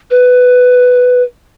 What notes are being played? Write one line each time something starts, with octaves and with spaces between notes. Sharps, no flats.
B4